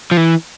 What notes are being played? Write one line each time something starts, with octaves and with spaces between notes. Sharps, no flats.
F3
E3